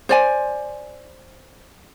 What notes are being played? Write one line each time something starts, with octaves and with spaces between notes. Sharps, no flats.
C5 D5 G#5